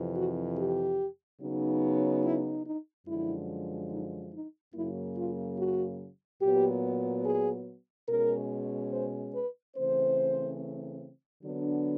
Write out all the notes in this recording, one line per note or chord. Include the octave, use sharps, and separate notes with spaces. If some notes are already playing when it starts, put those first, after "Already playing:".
Already playing: F2 C3 E3
F#4
G4
C#3 F#3 B3 D#4
E4
D#4
F#2 D3 F3 G#3 E4
D#4
D#4
F#2 C#3 F#3 A#3 E4
F4
F#4
A#2 F#3 B3 G4
G#4
B2 G#3 C#4 A#4
C5
B4
C#3 E3 A3 C4 C5
D3 F#3 B3 D4